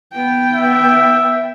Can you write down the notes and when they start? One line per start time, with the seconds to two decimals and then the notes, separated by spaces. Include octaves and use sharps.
0.12 B3 G5
0.54 E5